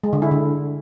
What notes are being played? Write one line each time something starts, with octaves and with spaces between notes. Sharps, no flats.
G#3
D3
E4
D3